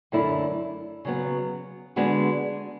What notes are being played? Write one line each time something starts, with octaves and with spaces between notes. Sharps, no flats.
F#2 D3 A3 E4
C#3 F#3 B3
D3 G#3 B3 D4 F#4